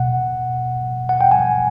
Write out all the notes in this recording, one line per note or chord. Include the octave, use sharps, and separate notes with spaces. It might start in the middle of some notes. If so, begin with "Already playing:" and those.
Already playing: B2 F#5
F#5
G5
G#5